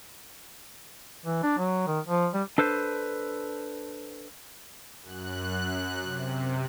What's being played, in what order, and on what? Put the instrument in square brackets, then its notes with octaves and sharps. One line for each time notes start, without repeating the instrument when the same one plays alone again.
[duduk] E3
D4
F#3
D#3
F3
G3
[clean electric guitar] D4 A4 B4 C5
[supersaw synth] F#2 F#6
C3